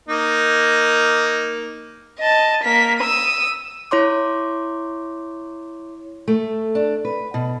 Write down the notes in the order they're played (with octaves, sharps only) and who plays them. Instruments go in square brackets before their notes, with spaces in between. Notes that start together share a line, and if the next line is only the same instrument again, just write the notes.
[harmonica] A#3 D#4
[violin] D#5 A5
A#3 B6
D#6 E6
[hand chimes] E4 C#5 C6 D6
[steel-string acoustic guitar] A3
D4
B4
B2